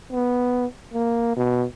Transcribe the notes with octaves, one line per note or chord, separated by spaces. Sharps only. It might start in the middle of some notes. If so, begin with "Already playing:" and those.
B3
A#3
B2